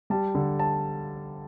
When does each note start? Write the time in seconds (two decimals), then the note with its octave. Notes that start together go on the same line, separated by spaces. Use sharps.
0.10 G3 A5
0.35 D3
0.59 A5